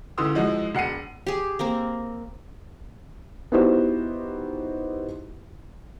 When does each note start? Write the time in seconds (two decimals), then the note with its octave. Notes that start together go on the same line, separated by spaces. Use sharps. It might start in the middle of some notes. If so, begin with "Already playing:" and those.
0.18 C#2 D3 E3 C6 D#6 E6
0.34 E3 F3 G#3 D#4 F#4
0.75 E1 F#5 C7 C#7 D#7
1.27 G4 G#4
1.59 A#3 C4 A#4
3.52 B3 D#4 E4 F#4 G4 C5